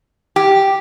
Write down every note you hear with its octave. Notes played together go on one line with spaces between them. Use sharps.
G4